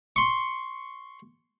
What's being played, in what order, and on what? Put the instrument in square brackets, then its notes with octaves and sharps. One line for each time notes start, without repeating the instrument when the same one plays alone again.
[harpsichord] C6 C#6